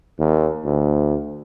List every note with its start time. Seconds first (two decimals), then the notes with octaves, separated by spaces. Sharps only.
0.19 D#2
0.65 D2